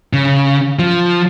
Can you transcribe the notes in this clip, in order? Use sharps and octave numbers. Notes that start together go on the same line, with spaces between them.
C#3
F3